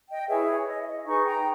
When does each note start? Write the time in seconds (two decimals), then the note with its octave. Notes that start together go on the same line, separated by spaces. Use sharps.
0.09 D#5 G5
0.19 D#5
0.28 E4 G#4 B4 C#5 E5
0.48 C#5
0.67 D#5
0.81 E5
0.86 D#5
1.05 D#4 G#4 B4 A#5 C#6
1.25 G5 A#5